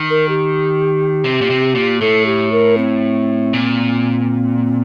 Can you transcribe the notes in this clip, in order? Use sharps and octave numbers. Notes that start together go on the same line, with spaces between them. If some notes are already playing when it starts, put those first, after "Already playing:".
Already playing: D#3
A#4
G4
C3
A#2
C3
A#2
A2 A4
G4
A#4
C4
A#2